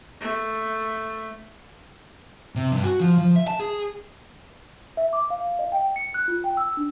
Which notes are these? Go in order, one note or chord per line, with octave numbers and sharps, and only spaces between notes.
A3
C3
G2
F#4
F3
F3
E5
A5
G#4
E5
D6
F5
D#5
G5
C#7
F#6
F4
G5
E6
D4